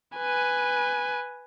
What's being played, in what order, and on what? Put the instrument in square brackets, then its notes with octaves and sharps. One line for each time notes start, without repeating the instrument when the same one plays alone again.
[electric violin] B4 G#5